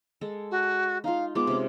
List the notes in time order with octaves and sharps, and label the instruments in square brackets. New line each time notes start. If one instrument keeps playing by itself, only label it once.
[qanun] G#3 A4
[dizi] F#4
[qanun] D#4 F4 [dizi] F5
[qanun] G#3 B3 F4 [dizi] D6
[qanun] C3 C#4